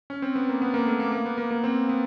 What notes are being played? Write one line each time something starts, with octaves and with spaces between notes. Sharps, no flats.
C#4
C4
B3
A#3
B3
A#3
A3
A#3
A#3
B3
A#3
A#3
C4
B3